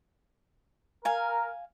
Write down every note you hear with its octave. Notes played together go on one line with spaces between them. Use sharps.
A#4 F5 G#5